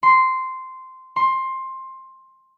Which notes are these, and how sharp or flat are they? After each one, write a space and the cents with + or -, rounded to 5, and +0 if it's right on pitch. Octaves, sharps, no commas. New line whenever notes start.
C6 -10
C6 +15